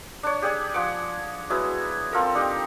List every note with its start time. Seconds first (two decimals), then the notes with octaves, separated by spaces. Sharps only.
0.23 D4 C#5
0.42 G4 G#4 D5 G#5
0.74 F3 F#5 D6
1.50 F#3 G#3 B3 E4
2.13 C4 F4 A4 A#4
2.35 D4 D#4 G4